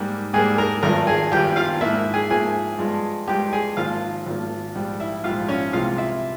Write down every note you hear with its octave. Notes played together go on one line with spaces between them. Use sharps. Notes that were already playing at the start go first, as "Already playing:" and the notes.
Already playing: G#2 G3 A#3
G#2 G3 A#3 G#4 G#5
A#4 A#5
G#1 G2 F3 A#4 A#5
G#4 G#5
G#1 G2 F3 G4 G5
F4 F5
G#2 F3 A#3 E4 E5
G#4 G#5
G#2 F3 A#3 G#4 G#5
G2 F3 G#3
G2 F3 G#3 G4 G5
G#4 G#5
G#1 G#2 F3 A#3 F4 F5
G#1 G#2 F3 A#3
A#1 G#2 G3
E4 E5
A#1 G#2 G3 F4 F5
C#4 C#5
C2 C3 E3 G#3 F4 F5
E4 E5